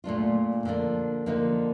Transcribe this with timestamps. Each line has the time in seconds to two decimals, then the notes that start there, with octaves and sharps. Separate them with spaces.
0.04 A#2 A3 D4 F4
0.65 D3 F3 A#3 D4
1.26 D3 F3 A#3 D#4